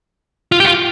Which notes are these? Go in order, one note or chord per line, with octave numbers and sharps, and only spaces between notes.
F4
G4
F4